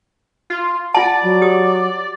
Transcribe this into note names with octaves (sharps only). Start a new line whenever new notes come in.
F4
F4 D5 F#5 A5
F#3
G4 D#6